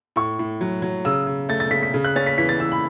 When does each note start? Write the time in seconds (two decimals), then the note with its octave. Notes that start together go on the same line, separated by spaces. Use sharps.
0.16 A2 C#6
0.39 A2
0.61 F#3
0.82 F#3
1.05 C#3 E6
1.27 C#3
1.49 A3 A6
1.60 A6
1.71 C#3 B6
1.83 B6
1.94 C#3
2.05 F#6
2.16 C#4 A6
2.26 B6
2.38 E3 B6
2.49 A6
2.60 E3 E6
2.72 B5